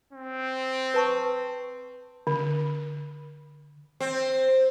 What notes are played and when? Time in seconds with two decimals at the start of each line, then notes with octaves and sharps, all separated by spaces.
0.13 C4
0.94 B4 A5 C#6
2.27 D3
4.00 C4